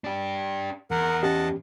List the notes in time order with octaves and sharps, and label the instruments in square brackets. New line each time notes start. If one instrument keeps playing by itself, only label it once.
[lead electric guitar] D4 G4
[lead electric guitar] E2 [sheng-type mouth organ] A#4 F#5
[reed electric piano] C#4 G4 [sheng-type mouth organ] D#5 F#5 A5